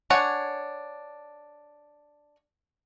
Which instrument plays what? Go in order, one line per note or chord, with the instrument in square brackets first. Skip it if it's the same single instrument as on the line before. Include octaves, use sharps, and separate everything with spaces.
[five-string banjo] D4 C#5 F#5 G#5